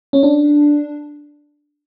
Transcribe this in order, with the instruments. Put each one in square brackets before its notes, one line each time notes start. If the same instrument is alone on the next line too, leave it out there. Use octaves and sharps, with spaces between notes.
[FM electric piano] C#4
D4